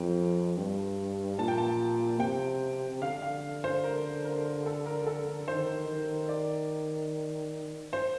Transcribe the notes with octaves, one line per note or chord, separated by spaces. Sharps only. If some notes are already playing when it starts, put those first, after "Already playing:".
Already playing: F2 G5
G2
A#2 A5
G5
A5
C3 G5
D3 F5
F5
C5
A#4
A#4
A4
A#4
A4
D#3 C5
D#3
D5
C5